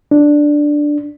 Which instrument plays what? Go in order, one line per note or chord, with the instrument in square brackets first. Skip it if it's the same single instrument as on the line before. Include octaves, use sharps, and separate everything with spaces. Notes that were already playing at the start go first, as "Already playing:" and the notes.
[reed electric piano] D4